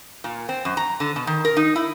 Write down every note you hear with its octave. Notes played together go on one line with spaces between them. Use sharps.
A#2
C4
F#2
A#5
D3
B2
D#3
A#4
D#4
E4